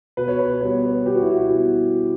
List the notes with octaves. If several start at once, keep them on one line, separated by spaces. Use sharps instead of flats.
B2 B4
C#5
B4
G3 B3 C#5
B4
B2 G4
F#4
E4
F#4
G3 B3